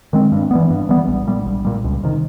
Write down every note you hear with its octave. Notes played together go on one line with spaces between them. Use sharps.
D#3 G#3 C4
G2
E3 G3 B3
G2
E3 G3 B3
A#1
A#2 G3
A#1
A#2 G3
C#2
C3 D#3